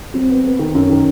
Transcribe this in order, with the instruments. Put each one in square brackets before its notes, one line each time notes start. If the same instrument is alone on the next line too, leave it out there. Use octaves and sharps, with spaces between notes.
[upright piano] F#3 [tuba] C4
[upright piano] B3
B3
D#3
[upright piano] F#2 [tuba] C#4
[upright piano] D#3